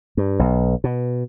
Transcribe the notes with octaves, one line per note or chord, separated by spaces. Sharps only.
G2
B1
B2